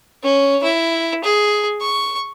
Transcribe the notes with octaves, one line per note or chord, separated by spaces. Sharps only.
C#4
E4
G#4
C#6